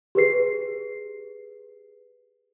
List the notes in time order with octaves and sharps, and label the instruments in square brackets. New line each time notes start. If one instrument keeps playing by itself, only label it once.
[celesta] G4 G#4 B4 C7